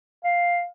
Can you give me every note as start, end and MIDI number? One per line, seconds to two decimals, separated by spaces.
0.24 0.64 77